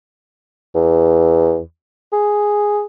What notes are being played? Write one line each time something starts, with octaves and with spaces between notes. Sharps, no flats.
E2
G#4